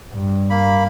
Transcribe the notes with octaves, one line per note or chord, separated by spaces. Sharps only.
G2
A#3 B5